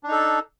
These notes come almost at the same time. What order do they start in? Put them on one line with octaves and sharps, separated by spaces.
D4 D#4 A4